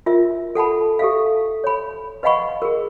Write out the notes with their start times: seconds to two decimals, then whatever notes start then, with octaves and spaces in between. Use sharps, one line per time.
0.06 F4 A#4 E5
0.55 A4 F#5 A5 B5
0.99 G4 A4 E5 F5
1.64 C#5 B5
2.23 B4 D#5 F5 F#5 B5 C#6
2.62 G#4 A#4